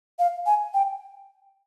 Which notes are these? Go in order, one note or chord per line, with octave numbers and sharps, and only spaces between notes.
F5
G#5
G5